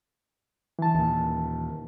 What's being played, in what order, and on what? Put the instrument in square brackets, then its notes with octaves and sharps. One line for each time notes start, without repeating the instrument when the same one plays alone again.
[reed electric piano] E3 A5
[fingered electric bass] D#2 A#2